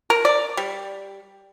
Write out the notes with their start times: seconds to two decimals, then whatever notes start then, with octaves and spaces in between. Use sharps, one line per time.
0.10 A#4
0.25 D5
0.57 G3